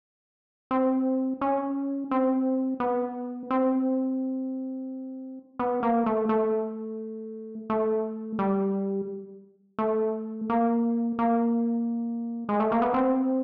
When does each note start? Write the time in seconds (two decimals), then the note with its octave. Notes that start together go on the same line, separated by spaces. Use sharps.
0.71 C4
1.41 C#4
2.11 C4
2.80 B3
3.51 C4
5.59 B3
5.83 A#3
6.06 A3
6.29 A3
7.70 A3
8.39 G3
9.79 A3
10.50 A#3
11.19 A#3
12.49 G#3
12.60 A3
12.72 A#3
12.82 B3
12.94 C4